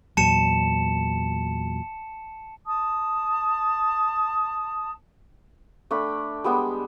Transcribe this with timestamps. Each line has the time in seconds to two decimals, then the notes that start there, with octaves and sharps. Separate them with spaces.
0.17 E2 A#2 F#3 A5 C#7 E7
2.66 A5 D#6
5.91 A3 D4 G5 B5
6.44 G3 G#3 B3 G5